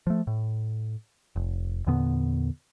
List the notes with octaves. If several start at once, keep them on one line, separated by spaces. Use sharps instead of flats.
F3 A3
A2
F1
E2 A#2 D3 B3